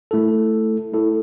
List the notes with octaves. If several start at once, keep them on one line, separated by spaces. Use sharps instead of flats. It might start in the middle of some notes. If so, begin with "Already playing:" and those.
A3 E4 A4
A3 E4 A4